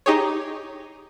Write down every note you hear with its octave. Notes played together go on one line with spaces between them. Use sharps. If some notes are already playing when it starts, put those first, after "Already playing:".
D#4 G4 G#4 C#5